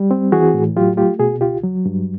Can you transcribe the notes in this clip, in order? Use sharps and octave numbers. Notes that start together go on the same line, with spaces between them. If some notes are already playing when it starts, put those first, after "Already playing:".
Already playing: G3
C4
E3 F#4 G#4
A2
F#3 F4 G4
A3 F4 G4
B2 F#4 G#4
C#2 F4 G4
F#3
G2